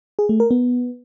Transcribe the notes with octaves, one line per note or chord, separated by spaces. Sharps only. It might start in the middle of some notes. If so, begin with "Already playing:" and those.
G#4
A3
A#4
B3